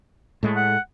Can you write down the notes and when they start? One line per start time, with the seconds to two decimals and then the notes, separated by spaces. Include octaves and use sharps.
0.43 A2 G#3 A3
0.57 F#5